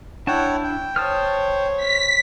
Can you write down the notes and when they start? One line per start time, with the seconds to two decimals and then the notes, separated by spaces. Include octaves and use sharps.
0.27 D4 E4 C#5 F#5 G5 A5
0.64 G5
0.96 C5 C#5 A5 D#6 F6
1.77 B6